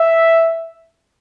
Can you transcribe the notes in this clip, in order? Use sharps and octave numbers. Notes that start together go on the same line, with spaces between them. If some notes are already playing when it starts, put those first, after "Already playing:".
Already playing: E5